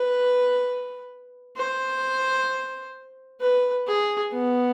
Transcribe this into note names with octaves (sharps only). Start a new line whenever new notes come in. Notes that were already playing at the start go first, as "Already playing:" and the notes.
Already playing: B4
C5
B4
G#4
B3